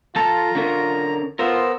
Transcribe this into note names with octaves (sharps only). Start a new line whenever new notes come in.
F3 F4 A4 A5 A#5
D3 C#4 A#4
B3 F4 A#4 C5 E6